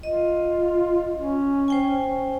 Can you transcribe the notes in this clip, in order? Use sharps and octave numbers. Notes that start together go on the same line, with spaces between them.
F4 D#5
C#4
C5 G5 G#5